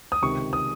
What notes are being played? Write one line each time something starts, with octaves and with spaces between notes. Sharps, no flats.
D#6
C#2 C3 D#3 C#6
D#6